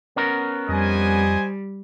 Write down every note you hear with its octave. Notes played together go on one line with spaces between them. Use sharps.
B3 C#4 A#4
F2 G3 C5 D#5 G#5